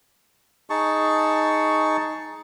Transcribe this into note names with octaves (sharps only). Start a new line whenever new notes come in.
D#4 G#4 A5 C#6